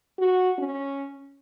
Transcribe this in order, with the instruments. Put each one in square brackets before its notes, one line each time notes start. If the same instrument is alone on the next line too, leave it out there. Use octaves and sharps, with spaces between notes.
[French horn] F#4
C#4